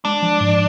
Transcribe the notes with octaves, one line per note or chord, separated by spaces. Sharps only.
G#3 D4
F3
G#2